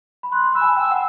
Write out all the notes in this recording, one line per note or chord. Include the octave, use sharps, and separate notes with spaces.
B5
C6 F#6
C6
B5 E6
G#5
A5
G5 E6
F#5